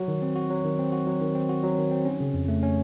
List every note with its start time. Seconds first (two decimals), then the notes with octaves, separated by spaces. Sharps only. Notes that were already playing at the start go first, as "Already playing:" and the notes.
Already playing: F#3 F#4
0.08 D#3
0.22 C4
0.36 F#4
0.50 F#3
0.64 D#3
0.79 C4
0.92 F#4
1.07 F#3
1.21 D#3
1.35 C4
1.49 F#4
1.63 F#3
1.78 D#3
1.91 C4
2.05 C#4
2.20 C#3
2.34 F2
2.48 A3
2.63 C#4